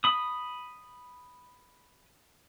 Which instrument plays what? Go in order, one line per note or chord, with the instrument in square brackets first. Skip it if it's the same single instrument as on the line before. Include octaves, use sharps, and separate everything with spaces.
[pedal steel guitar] B5 D#6